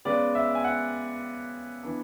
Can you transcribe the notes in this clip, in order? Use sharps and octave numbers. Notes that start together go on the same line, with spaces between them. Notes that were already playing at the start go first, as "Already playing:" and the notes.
C#3 G#3 B3 D5
E5
G#5
F#5
E3 B3 D4